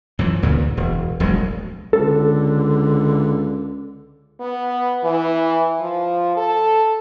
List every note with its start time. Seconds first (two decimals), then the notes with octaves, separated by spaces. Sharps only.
0.19 F#2 E3 F3
0.42 D2 A#2 C#3 E3
0.77 E1
1.20 E1 A#1 F#3 G#3
1.93 C#2 D3 A4
4.40 B3
5.04 E3
5.81 F3
6.37 A4